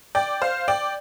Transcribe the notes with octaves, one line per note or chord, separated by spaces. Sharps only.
D5 G5
C5 F5
D5 G5